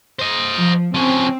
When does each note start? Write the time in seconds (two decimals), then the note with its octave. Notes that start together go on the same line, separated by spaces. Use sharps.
0.19 C5 D#5
0.56 F3
0.94 F3 C4 C#4